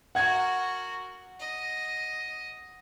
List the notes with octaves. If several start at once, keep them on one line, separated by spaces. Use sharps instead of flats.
F#4 A#4 F#5 G#6
D#5